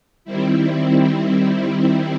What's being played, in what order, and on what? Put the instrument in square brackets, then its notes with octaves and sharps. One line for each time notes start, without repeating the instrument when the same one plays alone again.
[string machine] D#3 G3 C4 E4